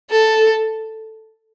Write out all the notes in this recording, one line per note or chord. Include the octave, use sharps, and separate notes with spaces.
A4